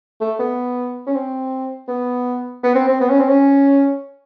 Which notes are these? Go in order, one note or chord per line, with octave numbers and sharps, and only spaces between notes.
A3
B3
C#4
C4
B3
B3
C4
C4
B3
C#4
C4
C#4